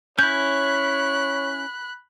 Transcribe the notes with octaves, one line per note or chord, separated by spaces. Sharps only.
C#4 E4 C#5 B5 F#6 G6